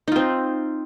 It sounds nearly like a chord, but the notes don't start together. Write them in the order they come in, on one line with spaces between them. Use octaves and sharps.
D#4 F4 C4